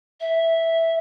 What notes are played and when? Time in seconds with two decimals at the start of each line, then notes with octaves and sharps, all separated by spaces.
0.20 E5